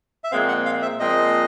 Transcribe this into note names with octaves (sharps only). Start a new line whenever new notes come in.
E5
A#2 F3 G#3 C4 F5
F#5
F5
E5
A#2 F3 G#3 C4 D#5